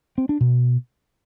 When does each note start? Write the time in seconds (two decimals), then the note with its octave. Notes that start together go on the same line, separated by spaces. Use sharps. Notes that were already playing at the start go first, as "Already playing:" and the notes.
0.18 C4
0.29 D4
0.41 B2